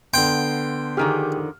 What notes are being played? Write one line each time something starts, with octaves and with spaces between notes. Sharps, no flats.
D3 B3 G5 C6
D3 D#3 F3 G4 G#4 F6